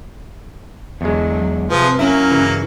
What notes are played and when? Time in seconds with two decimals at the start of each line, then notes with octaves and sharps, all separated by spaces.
1.01 E2 D3 F#3 G#3
1.70 C3 F3 G#4 B4
1.99 F#2 F#3 A#3 C#4 E4
2.31 G2 C#3 E3